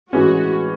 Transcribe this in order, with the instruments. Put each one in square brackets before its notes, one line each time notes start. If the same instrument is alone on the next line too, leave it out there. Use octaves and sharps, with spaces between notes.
[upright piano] A2 E3 G#3 C#4 [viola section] F#4